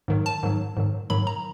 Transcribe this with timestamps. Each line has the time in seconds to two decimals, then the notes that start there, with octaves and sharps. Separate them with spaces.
0.08 G#2 D#3 F#3
0.26 A5
0.43 G#2 D#3 F#3
0.77 G#2 D#3 F#3
1.10 G#2 D#3 F#3 B5
1.27 A#5